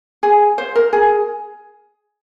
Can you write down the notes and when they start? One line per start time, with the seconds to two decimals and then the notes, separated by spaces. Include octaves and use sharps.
0.23 G#4
0.58 C5
0.76 A#4
0.93 G#4